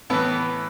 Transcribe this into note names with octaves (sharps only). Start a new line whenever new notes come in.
A2 E3 B3